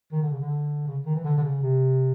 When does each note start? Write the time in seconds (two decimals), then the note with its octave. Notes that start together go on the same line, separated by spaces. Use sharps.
0.12 D#3
0.22 D3
0.31 C#3
0.41 D3
0.88 C#3
1.06 D#3
1.15 E3
1.24 D3
1.37 D3
1.43 C#3
1.62 C3